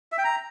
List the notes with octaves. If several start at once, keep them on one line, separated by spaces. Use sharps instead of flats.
E5
G5
A#5